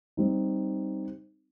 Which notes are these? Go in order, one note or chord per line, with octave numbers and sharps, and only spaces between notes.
G3 C4 D#4